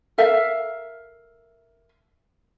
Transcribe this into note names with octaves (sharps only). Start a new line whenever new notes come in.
A4 A#4 E5 F5